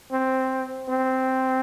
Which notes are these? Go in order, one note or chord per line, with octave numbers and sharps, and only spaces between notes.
C4
C4